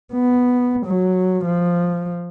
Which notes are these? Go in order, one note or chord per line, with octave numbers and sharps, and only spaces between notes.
B3
F#3
F3